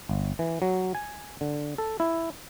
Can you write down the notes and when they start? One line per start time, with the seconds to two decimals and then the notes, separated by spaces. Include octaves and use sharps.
0.09 G1
0.39 E3
0.62 F#3
0.95 G#5
1.41 D3
1.78 A4
2.00 E4